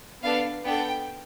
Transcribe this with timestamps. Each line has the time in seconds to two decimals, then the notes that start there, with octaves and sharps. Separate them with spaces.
0.23 B3 D4 A4 F5
0.64 B3 D4 A4 G5